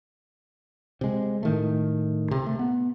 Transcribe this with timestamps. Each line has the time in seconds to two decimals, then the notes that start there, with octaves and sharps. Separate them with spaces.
1.01 C3 G#3
1.43 A2 D#3 A3
2.31 C3
2.46 A3
2.59 B3